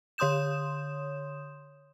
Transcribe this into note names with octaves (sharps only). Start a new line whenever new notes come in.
D3 C#5 C6 D#6 G6 E7